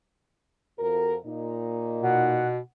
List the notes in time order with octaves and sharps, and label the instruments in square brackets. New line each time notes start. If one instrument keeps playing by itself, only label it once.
[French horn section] F2 F#4 A#4
A#2 D#4
[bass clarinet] B2 [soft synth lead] F#5